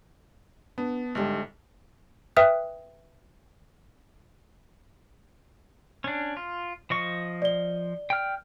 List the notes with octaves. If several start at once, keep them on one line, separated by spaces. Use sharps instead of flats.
B3 D4
G#1 G#2 D3 G3
B4 E5 G5 D#6 F6 F#6
C#4 D4
F4
F3 D#5 C#6
D5 G7
G5 F6